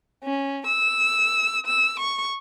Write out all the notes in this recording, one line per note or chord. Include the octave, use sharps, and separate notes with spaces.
C#4
E6
E6
C#6